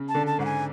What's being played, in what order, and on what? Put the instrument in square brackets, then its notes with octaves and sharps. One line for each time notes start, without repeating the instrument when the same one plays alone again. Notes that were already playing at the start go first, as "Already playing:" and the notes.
Already playing: [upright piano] C#3
[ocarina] A5
[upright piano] D3
[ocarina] A5
[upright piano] G#2 [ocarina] F#5
[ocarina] G#5